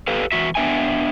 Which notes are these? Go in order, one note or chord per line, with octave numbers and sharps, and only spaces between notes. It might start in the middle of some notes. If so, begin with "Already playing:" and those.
G4 A4 B4 F5
E2 F#4 E5
B3 D4 E5 G5 G#5